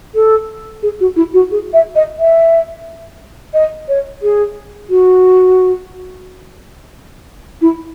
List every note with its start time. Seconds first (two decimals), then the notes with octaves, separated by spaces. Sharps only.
0.15 A4
0.83 G#4
1.00 F#4
1.16 E4
1.34 F#4
1.51 G#4
1.73 E5
1.95 D#5
2.19 E5
3.54 D#5
3.88 C#5
4.22 G#4
4.90 F#4
7.61 E4